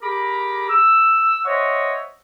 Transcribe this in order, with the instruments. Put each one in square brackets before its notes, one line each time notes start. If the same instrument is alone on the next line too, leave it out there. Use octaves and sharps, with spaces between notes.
[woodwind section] G4 G#4 A#4 A#5 B5 D6
E6
C5 C#5 D#5 E5 F#5 C#6